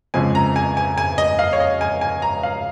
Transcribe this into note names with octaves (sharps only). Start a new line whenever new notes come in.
F2 C#3 F3 G#3 G#5
A#5
G#5
G#5
G#5
D#5
F5
C#5
D#5
G#5
G#5
A#5
F5